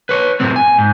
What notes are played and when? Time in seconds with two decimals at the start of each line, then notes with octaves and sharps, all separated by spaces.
0.09 B4 C#5
0.40 F#2 A2 C3 C4
0.56 G#5
0.78 G#2